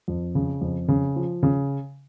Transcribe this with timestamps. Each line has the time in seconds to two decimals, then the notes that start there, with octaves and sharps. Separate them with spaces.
0.08 F2
0.35 C#3
0.61 F2
0.89 C#3
1.16 F3
1.43 C#3